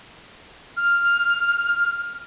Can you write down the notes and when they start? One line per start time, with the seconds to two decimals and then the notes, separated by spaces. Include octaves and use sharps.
0.77 F6